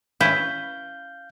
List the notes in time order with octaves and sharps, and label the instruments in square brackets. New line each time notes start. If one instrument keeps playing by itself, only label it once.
[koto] C#4 E4 B4 [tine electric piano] F5 G6